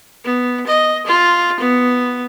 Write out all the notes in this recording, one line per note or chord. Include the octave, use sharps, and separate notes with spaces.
B3
D#5
F4
B3